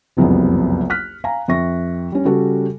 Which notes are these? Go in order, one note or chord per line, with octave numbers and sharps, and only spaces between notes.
F#1 C2 F2 F#3 B3
F6 F#6 B6
F5 G#5 A#5
F2 E5 C#6 A#6
G3 C#4
C#3 G3 F#4 A4